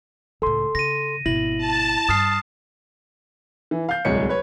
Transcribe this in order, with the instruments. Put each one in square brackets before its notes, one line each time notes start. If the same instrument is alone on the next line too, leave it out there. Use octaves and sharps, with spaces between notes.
[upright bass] C#2 A2 [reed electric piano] A4 C6
[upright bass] C#3 [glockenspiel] A#6 D#7
[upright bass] G#1 B2 [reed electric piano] E4 [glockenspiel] A#6 F#7
[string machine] A5
[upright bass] G2 [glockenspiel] D#6 F6 C7
[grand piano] E3
F5 G6
D1 C2 G#3 C#5 C#7
B4 C#5